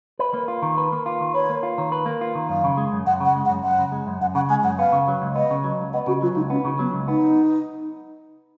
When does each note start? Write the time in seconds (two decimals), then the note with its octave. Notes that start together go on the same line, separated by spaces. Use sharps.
0.19 B4
0.34 A#3
0.48 F4
0.62 D#3
0.77 B4
0.92 A#3
1.06 F4
1.21 D#3
1.35 B4 C#5
1.50 A#3
1.63 F4
1.78 D#3
1.92 B4
2.06 A#3
2.21 F4
2.35 D#3
2.49 F#2 F5
2.64 C#3
2.77 G#3
2.92 F#2
3.06 F#2 F#5
3.20 C#3
3.26 F#5
3.36 G#3
3.45 F#5
3.50 F#2
3.63 F#2 F#5
3.79 C#3
3.92 G#3
4.07 F#2
4.21 F#2 F#5
4.35 C#3 F#5
4.50 G#3 G#5
4.64 F#2 F#5
4.79 B3 F5
4.92 C#3
5.08 F#3
5.22 C#2
5.36 B3 D#5
5.51 C#3
5.64 F#3
5.80 C#2
5.93 B3 D#5
6.07 C#3 F#4
6.22 F#3 F4
6.36 C#2 D#4
6.50 B3 C#4
6.65 C#3
6.79 F#3 B3
6.93 C#2
7.08 B3 D#4